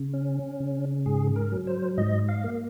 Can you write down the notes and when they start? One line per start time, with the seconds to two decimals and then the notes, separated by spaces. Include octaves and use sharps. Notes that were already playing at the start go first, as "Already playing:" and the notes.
Already playing: C#3
0.13 C#4
0.60 C#3
1.06 G#2 G#4
1.36 A#4
1.52 F#3
1.67 C5
1.98 G#2 D#5
2.29 F5
2.44 A#3